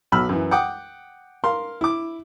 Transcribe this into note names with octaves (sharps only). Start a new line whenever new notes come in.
B1 F#3 B5 E6 F6
F#2 E3
F#5 G5 D6 D#6
A#4 F5 C6
E4 D6